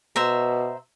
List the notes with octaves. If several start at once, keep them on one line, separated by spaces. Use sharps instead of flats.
B2 C5 E5 A#5